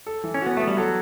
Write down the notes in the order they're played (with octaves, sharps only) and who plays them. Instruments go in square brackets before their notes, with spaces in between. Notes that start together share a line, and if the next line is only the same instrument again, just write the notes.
[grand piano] A4
E3
[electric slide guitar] C#4
[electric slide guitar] B3 [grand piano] F#4
[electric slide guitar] A3 [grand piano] B3
[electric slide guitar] G3
[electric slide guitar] F#3 [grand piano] A4